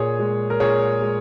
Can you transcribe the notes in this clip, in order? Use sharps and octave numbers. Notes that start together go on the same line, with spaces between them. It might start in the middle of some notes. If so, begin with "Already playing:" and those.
Already playing: A#2 G#4 C#5
G#3
A#4
A#2 G#4 C#5
G#3